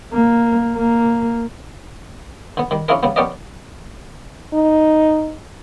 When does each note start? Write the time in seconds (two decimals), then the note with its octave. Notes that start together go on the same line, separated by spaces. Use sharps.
0.13 A#3
0.76 A#3
2.57 D3 B3
2.71 D#3 G3
2.88 C#4 D4 E4 F4 G#4 A#4
3.03 C#3 G3 B3
3.16 B3 C#4 G4 A#4 D5 D#5
4.54 D#4